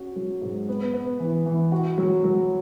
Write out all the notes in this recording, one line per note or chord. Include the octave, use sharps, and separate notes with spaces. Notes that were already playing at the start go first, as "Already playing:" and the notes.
Already playing: C#4 F#4
F#3
G#2
B3
B3
E3
E3
F#4
F#3
F#3